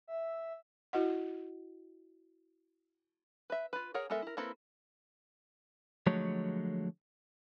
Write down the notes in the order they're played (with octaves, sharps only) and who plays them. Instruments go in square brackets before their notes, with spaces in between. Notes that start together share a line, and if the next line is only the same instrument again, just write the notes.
[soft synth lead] E5
[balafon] E4 F#4 D#5 F#5
[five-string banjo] B4 E5
F4 B4
G#4 A#4 C#5 F#5
G#3 B3 A4 A#4 E5
E4 A#4
A#3 C4 E4 A4 B4
[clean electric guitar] D3 F3 F#3 G#3 A3 C#5